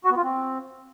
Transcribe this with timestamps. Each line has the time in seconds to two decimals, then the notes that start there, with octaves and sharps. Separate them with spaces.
0.04 F#4
0.11 B3
0.17 F4
0.23 C4